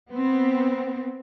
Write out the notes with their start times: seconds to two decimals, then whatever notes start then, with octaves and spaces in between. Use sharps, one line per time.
0.11 B3 C4